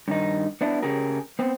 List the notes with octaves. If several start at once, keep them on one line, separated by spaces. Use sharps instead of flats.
G2 D#3 D#4
B3 D4 E4
C#3 G4 G#4 A#4
B3 C4